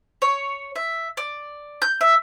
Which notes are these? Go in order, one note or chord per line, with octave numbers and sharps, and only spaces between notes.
C#5
E5
D5
G6
E5